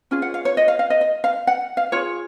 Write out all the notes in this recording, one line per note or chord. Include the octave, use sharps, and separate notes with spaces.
C#4 F4 G#4
F#5
F5
C#5
D#5
F5
F5
D#5
D#5
F5
F#5
F5
F4 G#4 C#5